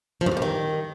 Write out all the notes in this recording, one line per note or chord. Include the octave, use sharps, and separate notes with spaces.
F3
G2
F2
G2
D#3